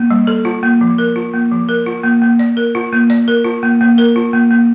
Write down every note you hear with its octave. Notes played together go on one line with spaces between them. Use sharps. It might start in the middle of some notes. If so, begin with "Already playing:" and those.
Already playing: A#3
G3
A4
F4
A#3
F3
A#4
F4
A#3
F3
A#4
F4
A#3
A#3
D5
A#4
F4
A#3
D5
A#4
F4
A#3
A#3
A#4
F4
A#3
A#3